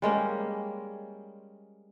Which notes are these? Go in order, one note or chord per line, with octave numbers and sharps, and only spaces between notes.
G3 G#3 A#3 C#4